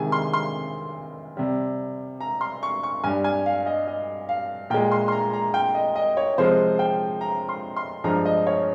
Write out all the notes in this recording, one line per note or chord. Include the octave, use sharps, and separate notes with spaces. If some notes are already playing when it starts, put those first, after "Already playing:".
Already playing: C3 D#3 G#3 G#5
C6
C6
C3 G3
A#5
C6
C#6
C#6
G2 G3 G#5
G#5
F5
D#5
D#5
F5
A#2 G#3 G5
C6
C6
A#5
A#5
G5
D#5
D#5
C#5
C3 F3 G#3 C5
G5
A#5
C6
C6
G2 F3 G#3 A#5
D#5
C#5